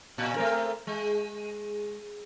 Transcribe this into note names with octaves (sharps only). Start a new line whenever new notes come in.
A#2
A3 C4 A#4
G#3